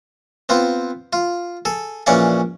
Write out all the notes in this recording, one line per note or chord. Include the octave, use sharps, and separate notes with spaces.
B3 C4 F4
F4
G#4 A4
A#1 E3 C#4 C#5 D5 F5